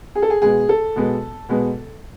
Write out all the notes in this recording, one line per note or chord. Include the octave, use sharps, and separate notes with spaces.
G#4
A4
G#4
B2 G#3 B3 G#4
A4
B2 G#3 B3
B2 G#3 B3